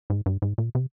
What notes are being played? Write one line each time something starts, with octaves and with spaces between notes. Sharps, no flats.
G#2
G2
G#2
A#2
C3